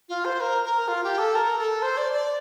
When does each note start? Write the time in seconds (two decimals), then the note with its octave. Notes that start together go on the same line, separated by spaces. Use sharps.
0.09 F4
0.25 C5
0.40 A#4
0.64 A#4
0.88 F4
1.04 G4
1.18 A4
1.35 A#4
1.58 A4
1.82 C5
1.97 D5
2.13 D5